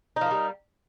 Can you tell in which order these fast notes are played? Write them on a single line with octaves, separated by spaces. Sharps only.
D#4 F3 A#3 G3